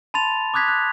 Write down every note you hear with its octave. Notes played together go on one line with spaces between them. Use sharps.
A5 B5 C6 A6 F7
D6 D#6 F#6 G#6 B6
F#6